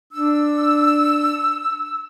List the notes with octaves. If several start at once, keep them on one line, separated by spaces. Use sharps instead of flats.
D4 E6